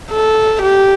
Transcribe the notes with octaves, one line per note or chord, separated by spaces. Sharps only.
A4
G4